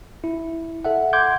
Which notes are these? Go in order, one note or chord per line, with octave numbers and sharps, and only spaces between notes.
E4
A4 E5 F#5
F#5 C6 D6 G6 G#6